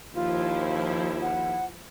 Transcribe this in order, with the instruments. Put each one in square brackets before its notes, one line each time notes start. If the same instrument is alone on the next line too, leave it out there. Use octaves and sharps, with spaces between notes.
[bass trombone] D#2 [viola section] F3 E4 [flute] F4
[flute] F#5